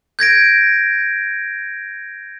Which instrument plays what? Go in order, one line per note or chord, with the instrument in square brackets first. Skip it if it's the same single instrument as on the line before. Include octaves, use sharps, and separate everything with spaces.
[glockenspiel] G6 G#6 A#6 D7